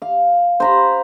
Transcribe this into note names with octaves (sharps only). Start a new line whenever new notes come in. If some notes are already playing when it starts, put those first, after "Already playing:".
F5
C5 A#5 B5